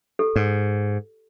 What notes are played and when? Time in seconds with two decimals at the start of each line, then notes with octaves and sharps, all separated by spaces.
0.19 G4 A4
0.36 G#2